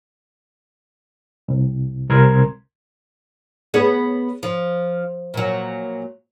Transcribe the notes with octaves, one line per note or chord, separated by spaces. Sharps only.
C2
C2 A#4 C6 G#6
B3 G#4 C#5
F3
A#2 F#3